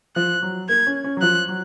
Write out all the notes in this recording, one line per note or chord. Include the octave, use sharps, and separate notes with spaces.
F3 F#6
F#3
A#3 G#6
C#4
C#4
F#3
F3 F#6
F#3